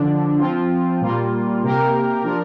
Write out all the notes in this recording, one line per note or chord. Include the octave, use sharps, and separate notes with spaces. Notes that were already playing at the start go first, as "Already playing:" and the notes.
Already playing: D3 F3 D4
F3 C4 F4
A#2 G3 A#3 F4
C3 A#3 G4 A#4
F3 D4 A#4